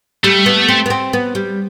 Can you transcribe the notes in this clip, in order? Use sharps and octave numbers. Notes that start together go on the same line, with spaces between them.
G3 A3
B3
C4
B3
C4
B3
G3